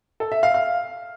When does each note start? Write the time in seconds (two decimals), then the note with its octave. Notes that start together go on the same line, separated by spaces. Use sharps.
0.20 A4
0.32 E5
0.43 F5
0.54 F5